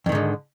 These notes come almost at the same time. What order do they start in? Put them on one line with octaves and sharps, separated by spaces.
F2 D#3 G#2 D3